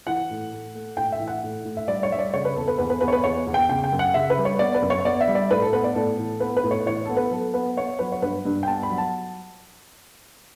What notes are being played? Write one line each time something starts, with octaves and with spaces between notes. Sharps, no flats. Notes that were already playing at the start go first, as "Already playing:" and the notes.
E3 F#5
A2
A3
A3
A2 G5
E5
E3
F#5
A2
A2
E5
G3 D5
C#5
G3 E5
D5
C#3 C#5
B4
E2 A4
B4
E2 B4
B4
E2 B4
C#5
B4
E2 C#5
E2
G5
C#3 G5
G5
F#2
F#5
C#3 E5
B4
G3
C#5
B3 D5
B4
F#2
C#5
B3 D5
E5
G3
D5
A2 B4
A4
B3 B4
D5
A2 A4
E3
B3 B4
B4
A2
C#5
E3 C#5
B3 A4
B4
F#3 A4
B3 B4
B3 C#5
F#3 B4
C#5
G2 B4
G2
G5
B3 A5
B5
F#3
A5